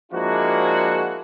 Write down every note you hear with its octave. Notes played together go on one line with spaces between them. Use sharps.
F3 G#3 A#3 D4 E4 F#4